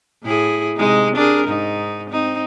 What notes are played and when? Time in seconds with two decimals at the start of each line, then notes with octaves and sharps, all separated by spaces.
0.24 A2 E4 G#4
0.76 C3 G#3 D#4
1.16 D4 G#4 A#4
1.46 G#2 D#4
2.10 C4 D#4